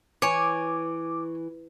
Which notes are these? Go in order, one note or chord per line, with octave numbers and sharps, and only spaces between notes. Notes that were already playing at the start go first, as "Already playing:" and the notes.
E3 C#5 G#5 D6